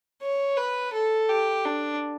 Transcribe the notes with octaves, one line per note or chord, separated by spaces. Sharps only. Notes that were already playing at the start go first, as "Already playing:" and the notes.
C#5
B4
A4
G4
D4